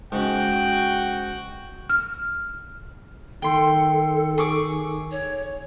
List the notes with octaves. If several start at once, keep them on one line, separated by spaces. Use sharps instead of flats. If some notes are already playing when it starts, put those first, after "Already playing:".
G#2 C#3 F#4 G5
F6
D#3 A4 G5 C6
G#4 C#6 D6
C#5